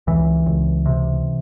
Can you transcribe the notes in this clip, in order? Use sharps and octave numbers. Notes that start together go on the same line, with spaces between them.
C#2 E3
C#2
C3